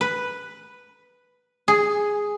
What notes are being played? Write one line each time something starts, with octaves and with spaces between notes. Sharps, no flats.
B4
G#4